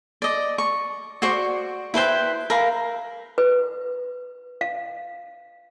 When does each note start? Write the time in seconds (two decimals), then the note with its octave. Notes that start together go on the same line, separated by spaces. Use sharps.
0.22 D5 D#5
0.58 C#6
1.22 F#4 C5 D5 C#6
1.94 E4 B4 C5 G5
2.50 A#4 F5 B5
3.38 B4
4.61 F5